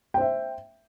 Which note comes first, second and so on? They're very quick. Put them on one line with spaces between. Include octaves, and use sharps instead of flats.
G5 C5 E5